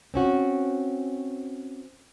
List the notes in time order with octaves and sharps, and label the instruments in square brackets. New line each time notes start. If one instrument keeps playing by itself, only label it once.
[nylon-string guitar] C4 C#4 F#4